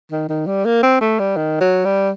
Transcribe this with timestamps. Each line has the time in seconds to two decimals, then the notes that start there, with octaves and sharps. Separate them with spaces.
0.12 D#3
0.29 D#3
0.47 G3
0.65 A#3
0.83 C4
1.01 A3
1.19 G3
1.36 D#3
1.61 F#3
1.85 G3